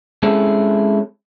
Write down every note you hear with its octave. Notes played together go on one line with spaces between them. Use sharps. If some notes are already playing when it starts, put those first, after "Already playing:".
G#3 C4 C#4 E4 G#4 A4